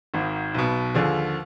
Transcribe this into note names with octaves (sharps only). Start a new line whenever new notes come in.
G#1 G#2 D#3
B1 B2
D#2 D3 F3 G#4